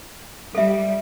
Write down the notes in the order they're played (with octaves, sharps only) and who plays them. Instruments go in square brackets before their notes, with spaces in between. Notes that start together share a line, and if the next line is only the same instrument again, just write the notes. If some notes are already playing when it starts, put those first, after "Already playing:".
[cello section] G3 [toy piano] A4 E5